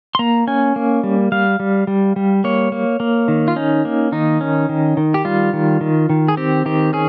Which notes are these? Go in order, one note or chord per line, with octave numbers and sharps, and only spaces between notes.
C6
A#3 A#5
C#4 G#5
A#3
G3
G3 F5
G3
G3
G3
A#3 C#5
A#3
A#3
D#3
F4
C#4 D#4
A#3
D#3 D#4
C#4
D#3
D#3
G4
G3 F4
D#3
D#3
D#3
G#4
C4 G4
D#3 G4
C#4 G#4